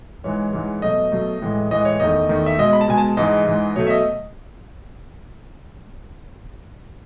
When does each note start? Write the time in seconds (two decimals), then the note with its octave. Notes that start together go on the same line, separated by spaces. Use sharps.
0.24 G#2 E3 G#3 C#5
0.53 G#2 E3 G#3
0.82 B2 F#3 A3 D#5
1.12 B2 F#3 A3
1.42 A2 E3 G#3
1.71 A2 E3 G#3 D#5
1.85 C#5
2.00 E2 D#3 A3 D#5
2.29 E2 D#3 A3
2.46 E5
2.58 B2 G#3 D#5
2.73 B5
2.81 A5
2.88 B2 G#3 G#5
2.98 A5
3.17 G#2 E3 G#3 D#5
3.46 G#2 E3 G#3
3.76 B2 F#3 A3 C#5
3.87 E5
3.90 D#5